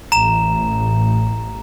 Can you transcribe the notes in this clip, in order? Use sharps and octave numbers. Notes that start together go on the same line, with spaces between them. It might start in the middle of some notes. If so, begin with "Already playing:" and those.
A1 A#5 E7